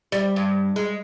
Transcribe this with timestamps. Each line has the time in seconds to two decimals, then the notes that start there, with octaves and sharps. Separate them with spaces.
0.12 G3
0.36 G2
0.76 G#3